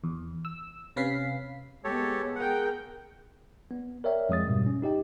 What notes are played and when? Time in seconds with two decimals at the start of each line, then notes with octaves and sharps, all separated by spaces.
0.04 E2
0.45 E6
0.96 C3 C#4 B4 F5 B6 C7
1.84 G#3 B3 G4 A4 C#5
2.36 G#4 A#4 F#5 G5
3.71 B3
4.04 A#4 C#5 D5 E5 G5
4.29 F2 G#3 D#6 A6
4.47 G#2 B2 G3
4.66 C#4
4.82 D#4 G4 D#5 G5